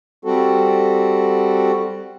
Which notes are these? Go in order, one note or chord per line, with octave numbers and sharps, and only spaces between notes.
G3 C4 F#4 A4